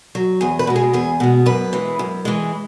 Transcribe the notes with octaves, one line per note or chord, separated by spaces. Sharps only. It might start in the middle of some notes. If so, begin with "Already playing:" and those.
F#3
E2 G#4
B4
B2 G#3
G#4
E2 G#4
B2 G#3
F#2 B4
E3 G#3
F#2
E3 G#3